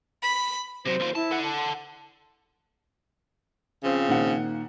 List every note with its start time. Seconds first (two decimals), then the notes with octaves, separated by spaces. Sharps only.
0.22 B5
0.86 C3 F#3 C5
1.00 D#2 F4
1.15 E4 A5
1.31 A4 F#5
1.44 A5
3.83 C#3 F3 C4
4.08 A#2 D#3 F#5